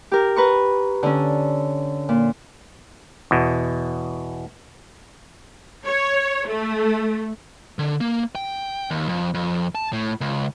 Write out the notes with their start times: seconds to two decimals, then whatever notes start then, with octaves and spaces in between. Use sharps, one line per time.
0.12 G4 A#4
0.36 B4 A#5 C#6
1.03 D3 C#4
2.09 A#2
3.31 E2 B2
5.86 C#5
6.47 A3
7.79 D3
8.01 A#3
8.35 G5
8.91 D#2
9.09 F2
9.34 F2
9.75 A5
9.93 A2
10.21 C#2